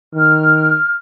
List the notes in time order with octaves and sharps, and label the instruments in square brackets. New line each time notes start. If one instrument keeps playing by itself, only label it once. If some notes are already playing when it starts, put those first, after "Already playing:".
[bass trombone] D#3 [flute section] F6